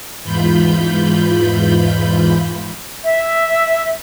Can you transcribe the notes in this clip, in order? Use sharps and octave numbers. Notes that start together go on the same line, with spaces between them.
E2 G#2 E3 F4 B5 G6
E5